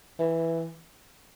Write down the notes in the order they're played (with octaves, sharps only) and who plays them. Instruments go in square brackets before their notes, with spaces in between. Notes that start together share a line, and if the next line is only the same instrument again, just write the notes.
[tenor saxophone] E3